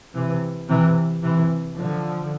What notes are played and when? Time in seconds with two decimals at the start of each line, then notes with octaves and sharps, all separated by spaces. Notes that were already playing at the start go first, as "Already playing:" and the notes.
0.14 C3 E3
0.68 C3 E3
1.22 C3 E3
1.77 D3 F3